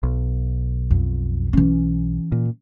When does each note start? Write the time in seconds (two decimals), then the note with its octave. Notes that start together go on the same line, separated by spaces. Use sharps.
0.03 B1
0.91 F2
1.53 E3 C#4
2.32 A#2